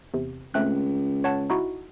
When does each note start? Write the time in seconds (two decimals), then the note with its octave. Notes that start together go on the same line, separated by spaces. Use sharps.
0.14 E2 C3
0.54 C#2 A3 C4 F#6
1.24 C#5 F#5 A5
1.50 D#4 E4 F#4